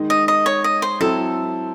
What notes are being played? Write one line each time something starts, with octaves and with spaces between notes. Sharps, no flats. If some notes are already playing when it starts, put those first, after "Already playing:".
Already playing: D#3 G#3 D#4
D#5
D#5
C#5
D#5
C5
F#3 C4 E4 A4